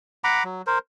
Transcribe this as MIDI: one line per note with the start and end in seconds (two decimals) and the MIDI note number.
0.24 0.44 78
0.24 0.44 82
0.24 0.44 83
0.24 0.44 86
0.44 0.62 54
0.67 0.79 70
0.67 0.79 72